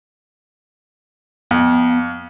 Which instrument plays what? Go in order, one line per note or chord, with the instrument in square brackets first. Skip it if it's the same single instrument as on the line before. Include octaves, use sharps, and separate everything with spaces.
[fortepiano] F2 [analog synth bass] B3